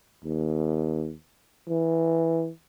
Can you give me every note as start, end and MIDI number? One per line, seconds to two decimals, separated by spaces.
0.25 1.12 39
1.68 2.49 52